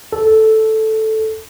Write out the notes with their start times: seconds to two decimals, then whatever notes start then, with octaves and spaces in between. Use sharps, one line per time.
0.13 A4